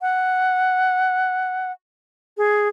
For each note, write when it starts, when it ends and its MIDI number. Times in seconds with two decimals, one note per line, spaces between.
0.01 1.72 78
2.37 2.68 68